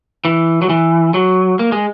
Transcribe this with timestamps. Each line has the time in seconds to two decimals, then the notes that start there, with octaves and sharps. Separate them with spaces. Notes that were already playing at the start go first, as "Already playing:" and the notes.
0.25 E3
0.62 F#3
0.69 E3
1.14 F#3
1.59 A#3
1.72 G#3